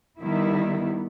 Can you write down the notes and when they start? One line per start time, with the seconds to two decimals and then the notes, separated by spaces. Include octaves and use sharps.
0.20 D#3 G3 B3 E4